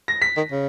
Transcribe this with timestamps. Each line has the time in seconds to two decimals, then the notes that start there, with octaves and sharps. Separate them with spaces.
0.08 A#6
0.22 B6
0.37 D#3
0.51 C#3